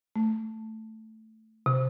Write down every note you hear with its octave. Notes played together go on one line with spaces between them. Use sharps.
A3
C3